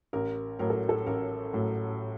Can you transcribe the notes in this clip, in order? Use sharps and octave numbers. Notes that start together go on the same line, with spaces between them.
A1 A#4
A2 F#3 A#4
A4
A4
A1 A#4
A2 F#3